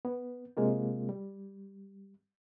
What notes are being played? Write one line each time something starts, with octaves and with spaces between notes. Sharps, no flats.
B3
C3 G#3 A#3 F4
G3